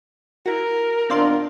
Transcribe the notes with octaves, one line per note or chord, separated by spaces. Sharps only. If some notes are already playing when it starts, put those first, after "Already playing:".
E4 F#4 A#4
A#2 D#3 B3 C4 D4 F4 D5 C6